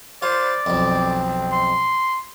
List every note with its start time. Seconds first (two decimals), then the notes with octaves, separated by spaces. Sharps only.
0.22 F4 C5 D5
0.66 B1 F2 C4
1.53 C6